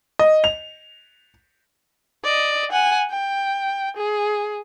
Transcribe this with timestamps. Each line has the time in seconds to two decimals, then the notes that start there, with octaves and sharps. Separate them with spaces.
0.19 D#5
0.44 F7
2.24 D5 D#5
2.72 F#5 G#5
3.11 G5
3.97 G#4